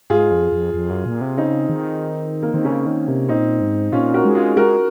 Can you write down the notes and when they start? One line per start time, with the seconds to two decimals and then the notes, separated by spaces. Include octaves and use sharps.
0.10 G#2 F4 G#4
0.31 F2
0.52 F2
0.74 F2
0.90 F#2
1.06 A#2
1.21 C3
1.37 C#3 C4 D#4
1.69 D#3
2.43 A#3
2.54 D#3 C4
2.65 C#3 A#3 C#4
2.86 D#3
3.08 C3
3.29 A#2 C4 D#4
3.61 G#2
3.92 A#2 C#4 F4
4.14 F#4 A#4
4.25 G#3
4.35 F4 G#4
4.57 G#3 F#4 A#4